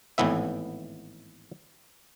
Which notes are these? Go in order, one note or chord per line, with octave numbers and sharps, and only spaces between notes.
G#1 A2 E3 B3 E5